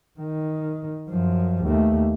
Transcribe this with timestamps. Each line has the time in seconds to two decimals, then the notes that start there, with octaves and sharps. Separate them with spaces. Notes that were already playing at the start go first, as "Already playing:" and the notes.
0.20 D#3
1.10 F#2 F3
1.64 D#2 A3